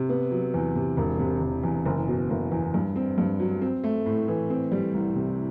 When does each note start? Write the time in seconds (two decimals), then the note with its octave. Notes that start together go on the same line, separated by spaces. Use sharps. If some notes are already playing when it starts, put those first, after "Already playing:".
Already playing: C3
0.09 B3
0.31 F#3
0.54 E2
0.75 C3
0.97 E1
1.19 C3
1.41 E1
1.63 E2
1.85 F#1
2.08 B2
2.30 F#1
2.52 E2
2.74 G2
2.96 C4
3.18 G2
3.40 F#3
3.62 C4
3.84 A3
4.06 A2
4.28 E3
4.50 C4
4.72 G3
4.94 C2
5.16 C3